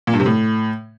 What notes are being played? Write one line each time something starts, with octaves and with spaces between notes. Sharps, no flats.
A#2
G2
C3
A2